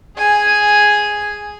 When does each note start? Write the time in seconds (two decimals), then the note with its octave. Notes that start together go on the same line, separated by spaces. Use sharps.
0.17 G#4 G#5